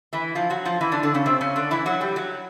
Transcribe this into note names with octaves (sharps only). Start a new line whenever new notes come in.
E3 E4
F3 F4
F#3 F#4
F3 F4
E3 E4
D3 D4
D3 D4
C#3 C#4
C3 C4
C#3 C#4
D3 D4
E3 E4
F#3 F#4
G3 G4
F#3 F#4